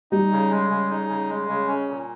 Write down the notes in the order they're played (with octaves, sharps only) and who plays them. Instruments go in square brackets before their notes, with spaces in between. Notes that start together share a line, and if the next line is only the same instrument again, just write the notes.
[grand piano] G3 [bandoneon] D#4
[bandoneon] C#3
G#3
C#3
D#4
C#3
G#3
C#3
C#4
A#2